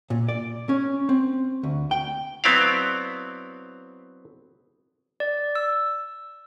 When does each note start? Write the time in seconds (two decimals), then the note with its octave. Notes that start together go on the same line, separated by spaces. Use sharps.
0.10 A#2
0.28 D5
0.69 C#4
1.09 C4
1.63 D2
1.91 G5
2.44 F#3 B3 C4 E4 D5 F5
5.20 D5
5.55 E6